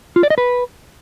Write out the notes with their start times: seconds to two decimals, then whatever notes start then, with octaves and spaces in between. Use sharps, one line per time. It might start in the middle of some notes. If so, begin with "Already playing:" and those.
0.16 F4
0.23 D5
0.30 D#5
0.38 B4